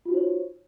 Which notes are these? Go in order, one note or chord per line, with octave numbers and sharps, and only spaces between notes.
D#4 F4 F#4 C5 C#5